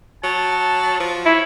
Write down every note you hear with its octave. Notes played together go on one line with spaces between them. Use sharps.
F#3 A5
F3
E4 C#5